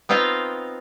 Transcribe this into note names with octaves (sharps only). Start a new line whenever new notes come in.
B3 C4 D#4 F4 F5 G5